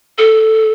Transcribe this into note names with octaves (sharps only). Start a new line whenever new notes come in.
A4